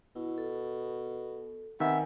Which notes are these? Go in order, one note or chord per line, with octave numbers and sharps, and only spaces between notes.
B2 E4
A4
C3 D#3 B3 E5 G#5